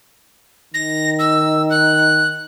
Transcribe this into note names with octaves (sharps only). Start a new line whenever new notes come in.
D#3 A#6
E6
F#6